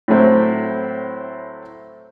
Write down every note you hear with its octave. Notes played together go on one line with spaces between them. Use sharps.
A2 F#3 A3 C4 E4